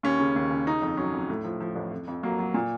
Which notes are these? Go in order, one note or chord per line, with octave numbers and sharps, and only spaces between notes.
D#2 C#4
C#3
D#2
C#3
C#3 D#4
F2
F#3 C#4
F2
A2
F3
F3
A1
F2
F2
F#3 A#3
F#3
A#2